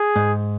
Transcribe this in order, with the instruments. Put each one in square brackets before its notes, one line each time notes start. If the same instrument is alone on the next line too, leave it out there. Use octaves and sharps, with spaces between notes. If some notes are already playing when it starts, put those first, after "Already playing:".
Already playing: [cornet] G#4
[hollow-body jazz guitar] G#2